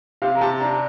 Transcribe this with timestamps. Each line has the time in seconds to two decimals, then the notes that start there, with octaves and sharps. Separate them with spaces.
0.22 C3 F5
0.35 A#5
0.41 C3 A5
0.60 D4 A#5